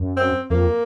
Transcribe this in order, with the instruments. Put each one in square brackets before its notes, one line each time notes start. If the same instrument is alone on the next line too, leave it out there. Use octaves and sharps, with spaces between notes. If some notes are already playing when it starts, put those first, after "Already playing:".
Already playing: [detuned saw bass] F#2
[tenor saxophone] C4
[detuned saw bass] F2 [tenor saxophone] A#3